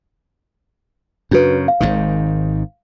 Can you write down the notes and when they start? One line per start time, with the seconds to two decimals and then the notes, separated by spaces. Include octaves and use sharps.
1.31 F#2 C#3 D4 F#4 B4
1.68 F5
1.80 G#1 G#2 D#3